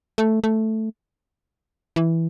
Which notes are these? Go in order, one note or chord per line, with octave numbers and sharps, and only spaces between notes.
A3
A3
E3